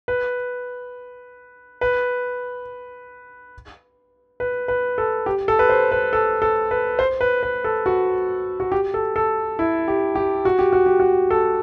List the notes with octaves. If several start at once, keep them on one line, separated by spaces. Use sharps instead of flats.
B4
B4
B4
B4
A4
G4
A4
B4
C5
B4
A4
A4
B4
C5
B4
B4
A4
F#4
F#4
G4
A4
A4
E4
G4
G4
F#4
G4
F#4
G4
F#4
A4